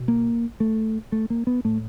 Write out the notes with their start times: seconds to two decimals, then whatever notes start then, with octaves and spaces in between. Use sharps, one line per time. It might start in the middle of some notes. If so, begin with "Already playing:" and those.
Already playing: B2
0.08 A#3
0.60 A3
1.12 A3
1.30 A#3
1.47 B3
1.65 A2 A3